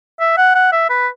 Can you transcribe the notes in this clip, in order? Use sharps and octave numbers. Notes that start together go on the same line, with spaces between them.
E5
F#5
F#5
E5
B4